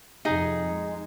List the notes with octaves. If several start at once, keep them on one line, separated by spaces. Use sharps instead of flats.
F2 C3 D#4 G#4
G#3